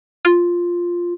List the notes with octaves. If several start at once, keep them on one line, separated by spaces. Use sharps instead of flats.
F4